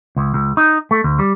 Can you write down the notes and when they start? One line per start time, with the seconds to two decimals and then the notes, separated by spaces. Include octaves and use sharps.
0.16 C#2
0.34 C#2
0.57 D#4
0.91 A3
1.04 D2
1.19 G3